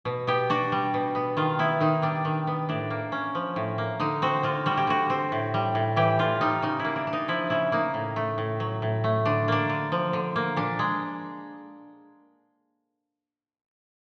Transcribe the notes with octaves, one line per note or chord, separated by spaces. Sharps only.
B2
B3 G4
D4 F#4
G3
B2
B3
D#3 F4
B3 E4
D#3 D#4
G3 D4
D#3
B3
A2 D4
A#3
C#4
F3
A2
A#3
D3 D#4
C4 F#4
D3 F4
G3 F#4
G4
D3 F#4
C4
A2
G3
A2
E3 G4
A2 F4
G3 D#4
C#3 D#4
E4
A#3
D4
D4
D#4
F3 E4
C#3 E4
A#3 D#4
A2
A3
A2
F#3
A2
A3
D3 D4
A#3 D4
D3
F3
D3
A#3
A#2 D4
G#3